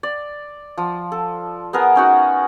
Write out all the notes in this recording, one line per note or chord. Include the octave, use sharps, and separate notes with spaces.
D5
F3
A4
B3 G#4 A#4
C#4 D#4 F#4